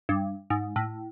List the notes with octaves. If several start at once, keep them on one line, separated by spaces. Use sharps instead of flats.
G2
G#2
A2